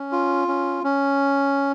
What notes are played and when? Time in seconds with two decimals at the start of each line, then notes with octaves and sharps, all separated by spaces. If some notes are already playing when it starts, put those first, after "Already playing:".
Already playing: C#4
0.12 F4
0.48 C#4
0.84 C#4